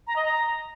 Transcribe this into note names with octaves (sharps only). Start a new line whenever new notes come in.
A#5
D#5
A#5